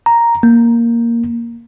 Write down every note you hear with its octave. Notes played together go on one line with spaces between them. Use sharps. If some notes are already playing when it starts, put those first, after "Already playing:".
A#5
A#3